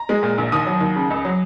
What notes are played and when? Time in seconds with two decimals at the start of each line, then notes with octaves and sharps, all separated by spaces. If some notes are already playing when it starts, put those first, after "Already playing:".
Already playing: A#5
0.09 G#3
0.23 A#2
0.38 A#1
0.52 D#2 D#6
0.66 F#3
0.81 D#2
0.96 C#3
1.10 C#2
1.25 F#3